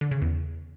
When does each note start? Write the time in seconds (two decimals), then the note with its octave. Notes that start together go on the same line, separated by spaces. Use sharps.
0.01 D3
0.11 C#3
0.22 E2